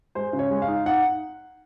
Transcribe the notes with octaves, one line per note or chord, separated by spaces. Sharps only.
G#3 C5
C#3
C#5
G#3
F5
D#4
D#4 F#5